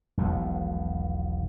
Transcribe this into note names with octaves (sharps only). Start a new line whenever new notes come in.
E1 B1 B2 F3